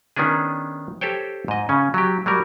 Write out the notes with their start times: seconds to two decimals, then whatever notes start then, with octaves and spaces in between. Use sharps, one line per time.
0.16 D#3 B3 C#4 D4 G#4
1.01 G4 A4 C5 C#5 G5
1.48 G#2 D#5
1.69 C#3 C#4
1.94 F#3 G4
2.26 F#3 G3 A#4